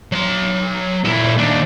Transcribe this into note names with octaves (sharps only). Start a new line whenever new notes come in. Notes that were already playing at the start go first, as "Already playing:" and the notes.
F#3 C6
A#2 E4
D#2 D4